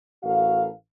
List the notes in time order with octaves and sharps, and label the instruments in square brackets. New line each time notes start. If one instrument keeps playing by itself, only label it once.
[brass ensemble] A1 F#4 A4 A#4 F5